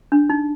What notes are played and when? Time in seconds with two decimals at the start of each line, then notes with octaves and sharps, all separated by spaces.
0.12 D4
0.30 D#4